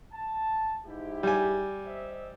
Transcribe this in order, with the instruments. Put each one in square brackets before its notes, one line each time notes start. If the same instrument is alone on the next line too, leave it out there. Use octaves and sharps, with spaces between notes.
[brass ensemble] A5
G#2 E4 G4
[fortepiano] G3 G#5
[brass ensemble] C5 D#5 E5